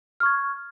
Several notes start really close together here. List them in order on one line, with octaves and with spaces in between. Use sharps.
F6 C#6 G#6